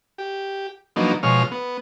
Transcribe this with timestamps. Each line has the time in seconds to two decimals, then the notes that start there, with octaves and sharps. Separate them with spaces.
0.18 G4
0.96 F3 F#3 A#3 B3 D4 D#4
1.23 B2 F3 G#3 C#5 C6 F6
1.51 B3